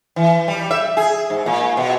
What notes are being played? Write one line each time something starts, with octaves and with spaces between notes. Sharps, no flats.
E3
G3
E5
G#4
G#2
A#2
B2